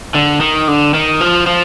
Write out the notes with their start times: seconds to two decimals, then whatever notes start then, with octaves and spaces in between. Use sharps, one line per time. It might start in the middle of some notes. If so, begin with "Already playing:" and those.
0.15 D3
0.41 D#3
0.68 D3
0.94 D#3
1.21 F3
1.47 F3